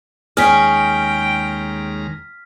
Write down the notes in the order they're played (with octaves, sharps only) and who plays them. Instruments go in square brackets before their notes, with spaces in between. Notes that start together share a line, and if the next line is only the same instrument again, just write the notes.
[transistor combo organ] D#2 G#3 A#5 [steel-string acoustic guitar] C#4 G#4 [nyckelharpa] G5 [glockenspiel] F6 B6